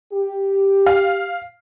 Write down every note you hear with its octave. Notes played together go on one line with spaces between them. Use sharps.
G4
F5